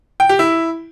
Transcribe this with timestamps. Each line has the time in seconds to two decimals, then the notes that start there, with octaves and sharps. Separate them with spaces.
0.20 G5
0.29 G4
0.39 E4